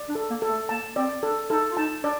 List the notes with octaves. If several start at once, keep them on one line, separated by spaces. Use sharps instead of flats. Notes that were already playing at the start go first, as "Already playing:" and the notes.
Already playing: D5
D4
A4
A#3
A4
A3
A#3 A5
C4 D5
D4 A4
D#4 A4
F4
D#4 A5
D4 D5